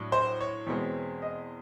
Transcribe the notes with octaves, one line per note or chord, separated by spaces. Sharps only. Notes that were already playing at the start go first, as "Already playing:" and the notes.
Already playing: A2 F#3 D4
C5
C#5
E2 B2 G#3 C4 C#5
D#5